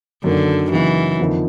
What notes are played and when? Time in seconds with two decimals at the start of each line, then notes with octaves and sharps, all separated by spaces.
0.24 F#2 D3 D#3 F#3 A#3 D4
0.72 C#3 E3 F#3 A#3 D#4 F#4
1.20 F2 D3 F3 A#3 D#4